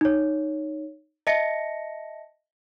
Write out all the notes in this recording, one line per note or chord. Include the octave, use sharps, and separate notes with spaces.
D#4 C#5
D#5 E5 A5 A#6 C#7